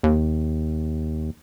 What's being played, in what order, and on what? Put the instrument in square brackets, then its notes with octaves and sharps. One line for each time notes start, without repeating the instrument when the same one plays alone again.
[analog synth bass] D#2